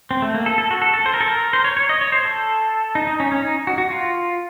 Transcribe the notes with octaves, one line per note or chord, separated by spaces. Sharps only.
C4
A3
A#3
A4
A4
F#4
A4
A4
C5
A#4
A4
A#4
C5
C#5
C#5
D#5
C#5
C5
A4
D#4
D#4
C#4
C#4
D#4
F#4
F#4
F4